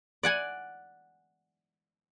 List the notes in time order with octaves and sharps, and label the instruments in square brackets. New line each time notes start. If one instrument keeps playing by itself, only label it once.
[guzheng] D5 F#5 G#5